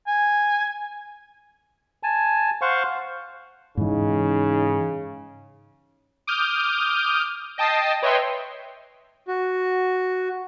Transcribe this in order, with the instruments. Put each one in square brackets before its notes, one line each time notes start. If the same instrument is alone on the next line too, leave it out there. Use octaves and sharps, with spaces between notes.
[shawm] G#5
[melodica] G#5 A5
C5 F5 F#5 C#6
[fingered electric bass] G#2 E3 [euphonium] C#3 [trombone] D#4
[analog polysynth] D6 D#6 F6 G6
D#5 G5 A5 D#6 A#6 C7
B4 C#5 D#5 E5 G5 C6
[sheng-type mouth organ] F#4